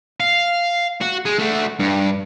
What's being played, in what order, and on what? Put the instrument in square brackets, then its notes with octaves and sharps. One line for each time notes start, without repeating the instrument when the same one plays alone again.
[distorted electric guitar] F5
F#4
G#3
A3 F#4
G2